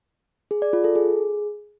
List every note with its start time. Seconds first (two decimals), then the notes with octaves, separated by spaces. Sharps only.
0.51 G#4
0.62 D5
0.73 F4
0.84 A4
0.95 G#4